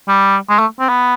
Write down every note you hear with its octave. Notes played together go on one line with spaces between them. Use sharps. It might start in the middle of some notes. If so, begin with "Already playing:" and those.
G3
G#3
A3
C4
B3